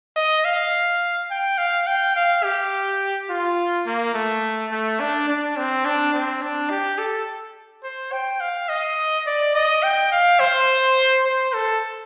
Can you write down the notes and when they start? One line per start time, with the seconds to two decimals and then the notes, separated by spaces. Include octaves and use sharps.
0.16 D#5
0.45 F5
1.31 G5
1.58 F5
1.87 G5
2.16 F5
2.44 G4
3.30 F4
3.86 A#3
4.14 A3
4.71 A3
5.00 D4
5.28 D4
5.57 C4
5.85 D4
6.13 C4
6.42 D4
6.70 G4
6.98 A4
7.83 C5
8.12 G5
8.41 F5
8.69 D#5
9.27 D5
9.55 D#5
9.83 G5
10.12 F5
10.40 C5
11.25 C5
11.53 A4